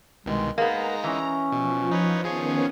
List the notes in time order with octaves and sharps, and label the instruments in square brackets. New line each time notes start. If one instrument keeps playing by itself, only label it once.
[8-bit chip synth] C2 B2 D#3 [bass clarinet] G#3
[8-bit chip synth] G#3 D#4 [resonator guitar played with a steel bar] A#3 B3 [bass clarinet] G#4 [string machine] A#5
[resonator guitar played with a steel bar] E3 [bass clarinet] C#4
[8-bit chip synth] B2 [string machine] F3
[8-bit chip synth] D#4 B4 C#5
[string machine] D#3 B3 C#4 [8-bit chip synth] F3 G#4 C#5